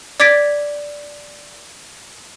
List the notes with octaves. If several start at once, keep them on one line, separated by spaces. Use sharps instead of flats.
D5 D6 G#6 A6 B6 D7